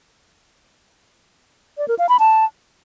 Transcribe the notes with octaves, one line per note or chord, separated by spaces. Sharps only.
D5
A#4
F5
B5
A5